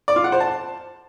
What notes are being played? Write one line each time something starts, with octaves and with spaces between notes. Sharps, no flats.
D5
F4
F#5
C5
A5